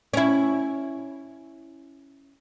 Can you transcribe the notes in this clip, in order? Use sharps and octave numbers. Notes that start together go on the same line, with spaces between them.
C#4 E4